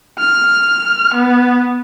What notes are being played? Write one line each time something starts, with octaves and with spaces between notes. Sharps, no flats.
F6
B3